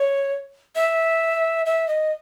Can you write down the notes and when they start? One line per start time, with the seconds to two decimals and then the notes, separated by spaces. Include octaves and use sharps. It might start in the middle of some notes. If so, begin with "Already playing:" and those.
Already playing: C#5
0.76 E5
1.66 E5
1.88 D#5